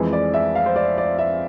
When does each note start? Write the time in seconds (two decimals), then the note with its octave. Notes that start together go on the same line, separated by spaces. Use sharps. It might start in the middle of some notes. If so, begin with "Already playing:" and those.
Already playing: F2 E3 G#3
0.13 D5
0.34 E5
0.55 F5
0.66 C5
0.76 D5
0.98 D5
1.19 E5